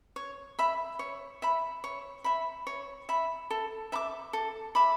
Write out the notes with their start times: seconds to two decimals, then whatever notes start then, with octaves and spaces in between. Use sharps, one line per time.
0.16 C#5
0.59 E5 B5
0.99 C#5
1.42 E5 B5
1.84 C#5
2.24 E5 B5
2.67 C#5
3.09 E5 B5
3.50 A4
3.92 E5 B5 D6
4.33 A4
4.75 E5 B5 D6